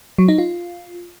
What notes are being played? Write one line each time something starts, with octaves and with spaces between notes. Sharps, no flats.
F#3
D#4
F4